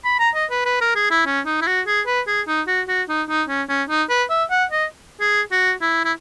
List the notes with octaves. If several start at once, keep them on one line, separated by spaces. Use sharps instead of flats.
B5
A#5
D#5
B4
B4
A#4
G#4
E4
C#4
D#4
E4
F#4
G#4
B4
G#4
D#4
F#4
F#4
D#4
D#4
C#4
C#4
D#4
B4
E5
F#5
D#5
G#4
F#4
E4
E4